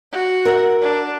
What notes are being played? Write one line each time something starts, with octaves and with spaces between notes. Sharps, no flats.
F#4
A#4 E5 F#5
D4